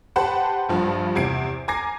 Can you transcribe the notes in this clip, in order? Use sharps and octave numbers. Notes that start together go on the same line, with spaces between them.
G4 B4 C5 F#5 A5 B5
A#1 G2 F3
E2 C3 G#6 C7 D7
G#5 A#5 D6 G#6 A#6 C7